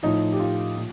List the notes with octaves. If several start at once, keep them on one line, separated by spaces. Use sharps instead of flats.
A2 F3 D#4
G4
F4
A#2